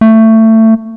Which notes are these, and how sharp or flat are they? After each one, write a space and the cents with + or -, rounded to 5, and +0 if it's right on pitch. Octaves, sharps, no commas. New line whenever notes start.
A3 +20